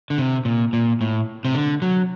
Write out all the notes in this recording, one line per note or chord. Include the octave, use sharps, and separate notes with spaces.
D3
C3
A#2
A#2
A2
C3
D3
F#3